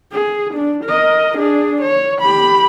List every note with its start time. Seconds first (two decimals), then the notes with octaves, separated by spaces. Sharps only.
0.12 G#4
0.54 D4
0.84 A#4 D#5
1.37 D4 G#4
1.82 C#5
2.21 G4 B5